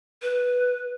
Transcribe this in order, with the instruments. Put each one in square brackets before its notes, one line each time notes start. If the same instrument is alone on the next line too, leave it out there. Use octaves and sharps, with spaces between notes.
[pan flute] B4